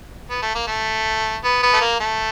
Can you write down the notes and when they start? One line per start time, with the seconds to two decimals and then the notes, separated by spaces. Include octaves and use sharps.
0.30 B3
0.42 A3
0.55 A#3
0.67 A3
1.44 B3
1.63 B3
1.74 A3
1.81 A#3
2.00 A3